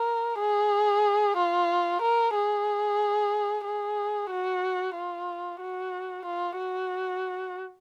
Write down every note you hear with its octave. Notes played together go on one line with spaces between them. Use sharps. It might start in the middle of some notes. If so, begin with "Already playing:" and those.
Already playing: A#4
G#4
F4
A#4
G#4
G#4
F#4
F4
F#4
F4
F#4